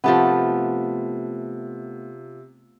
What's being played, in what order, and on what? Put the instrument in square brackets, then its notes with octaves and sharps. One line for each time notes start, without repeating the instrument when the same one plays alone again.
[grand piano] C3 [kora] F3 A3 B3